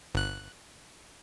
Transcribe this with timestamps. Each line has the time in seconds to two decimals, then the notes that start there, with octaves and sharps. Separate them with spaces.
0.15 G1 F#6